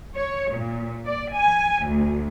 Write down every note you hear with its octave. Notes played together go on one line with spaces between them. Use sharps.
C#5
A#2
D5
G#5
D2